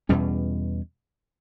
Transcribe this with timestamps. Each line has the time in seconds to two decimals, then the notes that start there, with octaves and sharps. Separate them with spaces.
0.09 E2 B2 G3 C#4